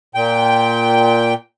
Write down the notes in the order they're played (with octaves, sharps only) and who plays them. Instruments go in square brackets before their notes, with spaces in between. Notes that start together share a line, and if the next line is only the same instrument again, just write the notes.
[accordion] A#2 G5